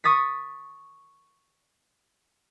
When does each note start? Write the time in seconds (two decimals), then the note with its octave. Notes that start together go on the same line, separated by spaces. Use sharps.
0.04 C#6 D#6 A6 B6